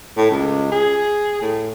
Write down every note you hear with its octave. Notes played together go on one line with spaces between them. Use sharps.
A2
C#2
G#4
A2